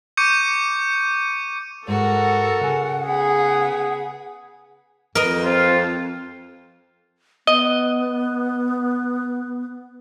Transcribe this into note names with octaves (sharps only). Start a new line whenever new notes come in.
C#6 D6 G6 C#7 D#7
G#2 F#4 A4 A#4 F#5
C#3 G#5
B3 G#4 B5
F2 A#4 B4 D#5
C4 F4
B3 D#5